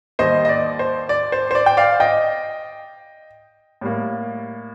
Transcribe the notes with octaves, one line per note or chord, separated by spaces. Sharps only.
D#2 D#3 G3 C5 D#5
D#5
D5
C5
D5
C5
C5
D5
G5
D5 F5
D#5 G5
A2 G3 A#3